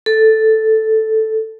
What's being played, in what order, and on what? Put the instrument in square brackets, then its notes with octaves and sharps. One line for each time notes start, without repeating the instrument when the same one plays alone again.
[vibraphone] A4